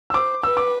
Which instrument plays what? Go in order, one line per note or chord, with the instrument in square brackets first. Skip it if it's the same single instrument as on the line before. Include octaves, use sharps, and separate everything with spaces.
[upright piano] E6
[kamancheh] C5 [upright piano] D6
[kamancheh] B4 [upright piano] E6
[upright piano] D6